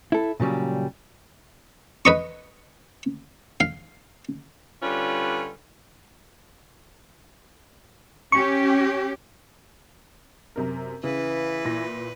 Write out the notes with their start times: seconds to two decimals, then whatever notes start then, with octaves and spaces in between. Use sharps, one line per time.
0.12 E4 A4
0.40 A#2 C#3 F#3 G3
2.05 B4 D#5 C#6
3.60 F5
4.82 D3 G3 C#4 F4 B4
8.32 C#4 G4 C#6
10.56 F#2 C3 A#4
11.04 C#3 E3 B4
11.65 A#2 E4 A#6